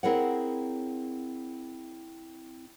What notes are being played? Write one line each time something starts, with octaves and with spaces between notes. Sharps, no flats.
C4 E4 G#4 A#4 C#5 F#5